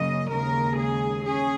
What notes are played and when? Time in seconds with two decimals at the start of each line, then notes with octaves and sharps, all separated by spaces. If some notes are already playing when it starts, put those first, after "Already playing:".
Already playing: F#2 C#3 A#3 C#4 D#5
0.31 D#2 C#3 G#3 A#4
0.78 G#4
1.25 C#4 G#4